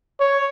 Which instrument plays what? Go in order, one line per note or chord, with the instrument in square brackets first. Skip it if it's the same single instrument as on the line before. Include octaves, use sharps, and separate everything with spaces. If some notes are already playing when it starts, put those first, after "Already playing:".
[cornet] C#5